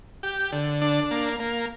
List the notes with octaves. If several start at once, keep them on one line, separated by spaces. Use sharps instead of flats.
G4
D3
D4
A#3
A#3